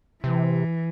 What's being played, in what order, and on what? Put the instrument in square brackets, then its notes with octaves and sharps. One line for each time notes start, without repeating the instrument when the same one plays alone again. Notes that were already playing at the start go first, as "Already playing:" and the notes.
[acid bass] C3 [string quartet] E3